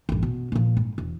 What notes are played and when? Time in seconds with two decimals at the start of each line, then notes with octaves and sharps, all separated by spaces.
0.09 A1 G2
0.23 B2
0.52 A#2 F3
0.77 G#2
0.98 E1